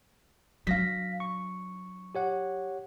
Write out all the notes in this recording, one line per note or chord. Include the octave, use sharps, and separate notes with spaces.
F#3 D4 F5 A#6 B6
C#6
G4 C#5 F#5